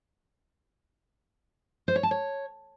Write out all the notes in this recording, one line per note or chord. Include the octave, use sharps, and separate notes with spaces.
C5
C#5
A5
C#5